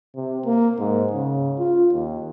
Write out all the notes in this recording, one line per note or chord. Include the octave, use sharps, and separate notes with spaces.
C3
A#3
G#2
C#3
F4
D#2